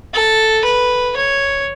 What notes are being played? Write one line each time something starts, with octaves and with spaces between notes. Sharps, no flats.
A4
B4
C#5